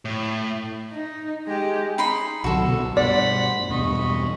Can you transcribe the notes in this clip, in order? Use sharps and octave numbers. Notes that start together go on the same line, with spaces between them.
A2
D#4
G#3 G4
D#4 B5 C6
C2 D3 F#3 F#4 A4
C2 B2
G2 B2 C5 D5 F#5 B5
E2 G2 B2 D#5 B5 C#6